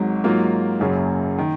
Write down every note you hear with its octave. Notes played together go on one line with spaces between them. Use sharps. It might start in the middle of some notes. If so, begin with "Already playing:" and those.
Already playing: G#1 G#2 F#3
G#2 F#3 A#3 F4
F#1 F#2 C#3 F#3
D#3